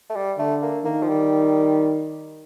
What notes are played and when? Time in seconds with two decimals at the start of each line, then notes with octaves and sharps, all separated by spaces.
0.10 A3
0.16 G3
0.39 D3 A3
0.62 A#3
0.85 D#3 A#3
1.03 F3
1.09 G3